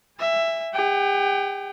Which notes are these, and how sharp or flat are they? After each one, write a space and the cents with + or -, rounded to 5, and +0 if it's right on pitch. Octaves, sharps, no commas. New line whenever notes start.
E5 +10 G#5 -30
G4 +45 G5 -35